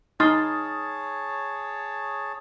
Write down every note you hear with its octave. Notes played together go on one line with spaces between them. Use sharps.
D#4 G#4 C#5 A5 C6 D#6 F6 A6